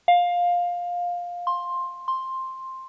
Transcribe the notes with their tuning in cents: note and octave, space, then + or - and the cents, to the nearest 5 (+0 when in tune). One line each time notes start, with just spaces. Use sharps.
F5 +15
C6 +15
C6 +10